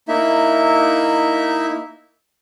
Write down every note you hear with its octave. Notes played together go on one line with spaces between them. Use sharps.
A#3 D#4 E4 E5